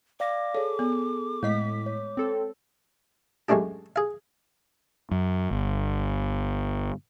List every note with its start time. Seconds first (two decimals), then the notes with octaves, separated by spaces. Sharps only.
0.20 D5 F5 D6 A#6
0.55 G#4 A4 C#5
0.79 B3
1.43 A2 G#3 D#5 B6
1.86 C#5
2.17 C4 A4
3.49 A1 F#2 G#3 A3 D4 G4
3.96 G#4 F5
5.11 F#2
5.51 G1